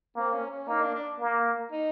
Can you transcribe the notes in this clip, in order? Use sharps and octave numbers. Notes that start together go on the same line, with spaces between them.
A#3 C4
C#4
C#4
A#3 D#4
D4
D4
A#3
D#4